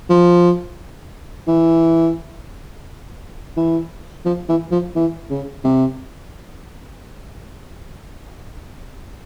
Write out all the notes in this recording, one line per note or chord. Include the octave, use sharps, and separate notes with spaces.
F3
E3
E3
F3
E3
F3
E3
C#3
C3